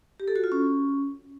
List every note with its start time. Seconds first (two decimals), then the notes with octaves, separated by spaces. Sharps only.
0.20 G4
0.28 A4
0.36 F#4
0.44 F4
0.52 C#4